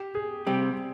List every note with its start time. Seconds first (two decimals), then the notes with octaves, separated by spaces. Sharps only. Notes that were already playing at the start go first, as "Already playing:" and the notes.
Already playing: G4
0.15 G#4
0.47 C3 G3 C4 G4